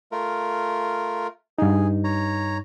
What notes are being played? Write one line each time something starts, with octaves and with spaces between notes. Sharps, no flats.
A3 F4 A#4
G2 D#4 G#4
C#5 A#5